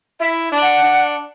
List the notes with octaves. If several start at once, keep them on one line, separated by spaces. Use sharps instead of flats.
E4 E5
D4
F#5
D4